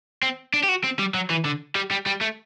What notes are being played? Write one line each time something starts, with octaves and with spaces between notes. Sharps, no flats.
C4
D4
G4
F#4
C4
G3
F#3
E3
D3
G3
G3
G3
A3